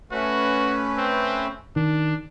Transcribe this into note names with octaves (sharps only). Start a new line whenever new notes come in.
A3 C#4 F#4 B4
C4
D#3 D4